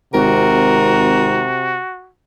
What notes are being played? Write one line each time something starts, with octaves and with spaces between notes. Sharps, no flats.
G#1 C3 F#4 A#4